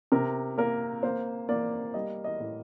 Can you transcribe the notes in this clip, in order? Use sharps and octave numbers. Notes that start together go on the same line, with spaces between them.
C3 A#4
A#3 A#4
A#3 C5
A#3 D5
G3 D#5
D#5
A2